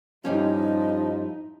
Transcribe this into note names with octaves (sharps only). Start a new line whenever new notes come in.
G2 F3 G3 C#4 D#4 E4 D#5